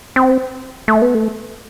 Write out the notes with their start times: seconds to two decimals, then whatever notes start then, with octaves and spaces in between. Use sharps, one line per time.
0.16 C4
0.88 A3
1.02 B3
1.15 A3